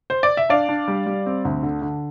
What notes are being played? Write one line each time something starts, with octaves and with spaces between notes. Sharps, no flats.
C5
D5
E5
D4 D5 F5
D4
G3
G3
C4
D2
D3
D3